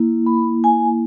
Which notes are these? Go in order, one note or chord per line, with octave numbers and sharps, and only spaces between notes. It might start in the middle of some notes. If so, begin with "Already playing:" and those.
Already playing: A#3 E4
B5
G#5